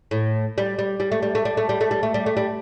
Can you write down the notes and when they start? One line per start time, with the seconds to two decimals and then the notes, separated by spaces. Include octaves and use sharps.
0.11 A2
0.58 G3
0.79 G3
1.00 G3
1.12 A3
1.22 G3
1.35 A3
1.45 G3
1.57 A3
1.69 G3
1.81 A3
1.91 G3
2.03 A3
2.14 G3
2.26 A3
2.37 G3